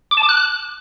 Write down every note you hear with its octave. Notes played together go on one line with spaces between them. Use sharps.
D6
A5
D6
F#6